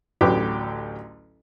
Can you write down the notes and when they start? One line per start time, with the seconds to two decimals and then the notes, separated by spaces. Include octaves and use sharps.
0.21 A1 D2 D3 F#3 G4 B4